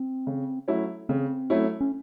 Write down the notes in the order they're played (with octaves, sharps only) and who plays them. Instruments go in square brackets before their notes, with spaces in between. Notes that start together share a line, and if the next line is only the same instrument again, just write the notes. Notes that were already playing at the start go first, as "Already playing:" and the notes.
Already playing: [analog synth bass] C4
[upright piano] C#3
F#3 A3 C#4 E4
[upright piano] C#3 [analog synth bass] C4
[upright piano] F#3 A3 C#4 E4
[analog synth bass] C#4